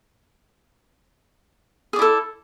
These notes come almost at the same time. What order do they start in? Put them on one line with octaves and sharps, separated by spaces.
G#4 D5 E4 A4